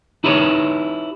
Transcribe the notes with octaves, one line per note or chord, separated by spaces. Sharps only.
D#4 E4 G4 G#4 B4 C#5